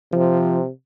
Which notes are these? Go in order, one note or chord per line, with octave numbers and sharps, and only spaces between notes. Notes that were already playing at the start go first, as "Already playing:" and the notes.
C3 F3